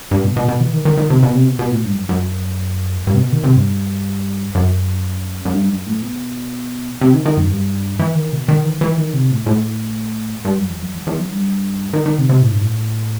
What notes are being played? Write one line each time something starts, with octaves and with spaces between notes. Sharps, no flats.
G2
B2
B2
B2
E3
D#3
D#3
D#3
C3
B2
C3
B2
B2
A2
G2
F#2
F#2
G2
C3
B2
D#3
C3
G2
F#2
F#2
G2
F#2
A2
B2
C3
D#3
D#3
F#2
G2
E3
D#3
B2
D#3
E3
E3
D#3
C3
A2
A2
G2
F#2
E2
F#2
E2
E2
F#2
G2
D#3
D#3
C3
C3
A2
G2
A2